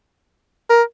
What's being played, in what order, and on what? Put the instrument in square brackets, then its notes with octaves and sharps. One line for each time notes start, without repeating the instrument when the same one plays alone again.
[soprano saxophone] A#4